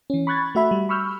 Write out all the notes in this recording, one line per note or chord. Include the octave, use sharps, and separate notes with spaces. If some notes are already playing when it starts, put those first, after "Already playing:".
E3 C#4
B5 C#6 F#6 G#6 A6
A3 F#4 E5 B5
G3
B5 C#6 E6 F6 G6